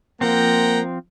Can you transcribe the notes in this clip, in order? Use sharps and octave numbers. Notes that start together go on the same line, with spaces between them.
F3 A#3 C4 F#5 G5 A#5